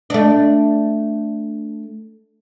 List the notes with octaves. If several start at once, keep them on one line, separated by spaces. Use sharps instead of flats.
A3 D4